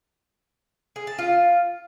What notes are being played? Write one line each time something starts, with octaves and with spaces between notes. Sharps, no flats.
G#4
A5
F4